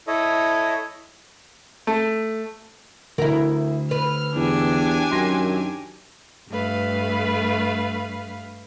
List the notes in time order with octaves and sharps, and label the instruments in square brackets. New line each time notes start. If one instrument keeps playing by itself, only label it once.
[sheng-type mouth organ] E4 A4 C#5 D#5
[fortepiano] A3
[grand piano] D2 [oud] E4 A#4
[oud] B4 [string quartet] F6
[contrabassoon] E2 [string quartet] D4 G4 G#5
[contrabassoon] F#2 [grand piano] D#3 C6 A#6
[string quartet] G2 A3 B4 F5